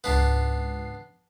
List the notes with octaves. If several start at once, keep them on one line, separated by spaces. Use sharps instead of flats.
C#2 G#2 B3 D4 C7